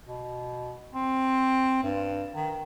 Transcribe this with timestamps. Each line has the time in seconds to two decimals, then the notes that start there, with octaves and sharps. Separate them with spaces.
0.08 B2
0.93 C4
1.83 G2
2.35 D#3